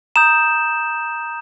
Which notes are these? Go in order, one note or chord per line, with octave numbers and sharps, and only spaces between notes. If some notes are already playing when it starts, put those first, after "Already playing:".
A#5 D#6 G6 E7